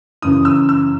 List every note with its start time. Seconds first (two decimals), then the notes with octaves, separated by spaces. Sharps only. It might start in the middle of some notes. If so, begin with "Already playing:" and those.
0.22 F#2 C#3 E3 D#6
0.45 E6
0.69 E6